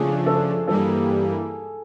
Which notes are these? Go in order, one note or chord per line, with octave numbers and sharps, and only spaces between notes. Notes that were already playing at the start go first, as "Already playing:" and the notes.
Already playing: C#3 F3 A3 D4 G#4
A4
G2 E3 G3 A#3 A4